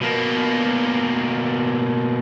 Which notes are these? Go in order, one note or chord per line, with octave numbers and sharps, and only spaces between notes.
B2 A#3